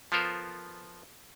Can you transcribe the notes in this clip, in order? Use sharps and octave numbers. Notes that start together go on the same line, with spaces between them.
F3 B3 F4 A4 A#4 C5